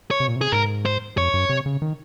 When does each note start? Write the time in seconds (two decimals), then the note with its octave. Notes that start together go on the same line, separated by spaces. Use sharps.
0.11 C#5
0.20 C3
0.28 A#2
0.36 C3
0.41 G#4
0.52 G#2 A#4
0.86 C5
1.17 F2 C#5
1.34 F#2
1.49 C3
1.66 C#3
1.82 D#3